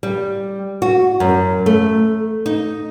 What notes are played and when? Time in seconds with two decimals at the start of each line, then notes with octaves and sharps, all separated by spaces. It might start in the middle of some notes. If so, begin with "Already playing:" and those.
0.03 G3
0.82 F#4
1.20 F#2
1.66 A3
2.46 D#4